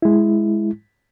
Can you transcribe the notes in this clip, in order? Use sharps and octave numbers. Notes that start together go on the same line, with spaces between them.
G#3 E4